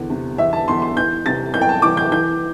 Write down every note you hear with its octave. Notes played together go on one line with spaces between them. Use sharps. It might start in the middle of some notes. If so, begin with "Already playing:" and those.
Already playing: E2 D3
C3
E2 E5
A5
E2 C6
C6
E3 G6
C3 A6
C2 G6
G5
A5
E3 D6
G6
E3 G6